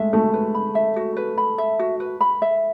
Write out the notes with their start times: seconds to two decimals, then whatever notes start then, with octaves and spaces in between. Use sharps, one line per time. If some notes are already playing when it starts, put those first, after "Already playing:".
Already playing: G#3 A3 E5
0.13 A3 F#4
0.34 B4
0.55 B5
0.75 E5
0.96 F#4
1.17 B4
1.38 B5
1.58 E5
1.79 F#4
2.00 B4
2.21 B5
2.42 E5